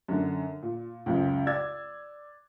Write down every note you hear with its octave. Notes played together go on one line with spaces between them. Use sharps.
F#2 D3
A#2
C#2 F#2 C#3
D5 E6 G#6